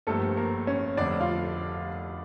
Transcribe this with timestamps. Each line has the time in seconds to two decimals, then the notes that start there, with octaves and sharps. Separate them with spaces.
0.07 G1 G2 F3 A3 A#3 A4
0.37 A#3 A#4
0.67 C#4 C#5
0.97 F1 F2 D3 A3 D4 D5
1.20 F4 F5